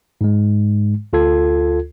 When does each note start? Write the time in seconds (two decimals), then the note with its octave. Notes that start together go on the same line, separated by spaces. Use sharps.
0.21 G#2 G#3
1.13 D2 F4 A4 G#6